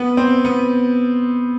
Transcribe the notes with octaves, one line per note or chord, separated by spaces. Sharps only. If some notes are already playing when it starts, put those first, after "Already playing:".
Already playing: B3
C4
B3